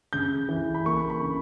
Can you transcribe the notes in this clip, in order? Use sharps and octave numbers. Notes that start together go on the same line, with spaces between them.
C#3 G6
E3
B5
A#3 C#6
B5
C#3